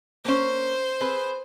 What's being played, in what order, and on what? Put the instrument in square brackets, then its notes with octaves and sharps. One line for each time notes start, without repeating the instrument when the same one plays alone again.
[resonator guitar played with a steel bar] A#3 C#4 [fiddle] C5
[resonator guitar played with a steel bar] C4 G#4 B4